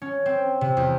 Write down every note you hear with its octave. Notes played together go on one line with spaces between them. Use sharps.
C#4
C4
C3
E2